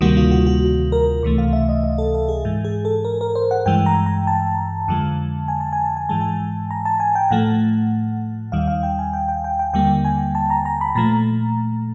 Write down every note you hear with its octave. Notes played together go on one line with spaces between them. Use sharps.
D2 C3 D#3 G3 A#3 F#4
F4
F#4
F#4
A#4
C#2 C3 E3 A3
F5
E5
D#5
D#5
A4
A4
G#4
G#2 E3 G#3
G#4
A4
A#4
A#4
C5
F#5
G2 E3 G#3 G5
A#5
A#5
A5
F2 D3 F3 G#3
G#5
A5
G#5
A5
G#5
G#2 E3 G#3 A5
G#5
A#5
A5
G#5
G5
A2 F3 A3 F#5
D#2 D#3 G3 F5
F5
G5
G#5
G5
G5
G5
G5
D#2 D3 G3 A#3 G5
G#5
A5
A#5
A#5
B5
A#2 F3 A3 A#5